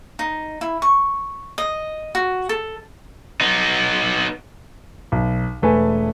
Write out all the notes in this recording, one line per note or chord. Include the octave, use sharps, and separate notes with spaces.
D#4
E4
C#6
D#5
F#4
A4
B3 D#4
B1
E1 A3 B4 G#5